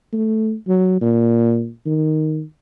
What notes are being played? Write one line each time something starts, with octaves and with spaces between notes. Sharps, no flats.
A3
F#3
A#2
D#3